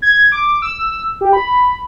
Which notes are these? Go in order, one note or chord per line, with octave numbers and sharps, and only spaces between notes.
G#6
D6
E6
G4
B5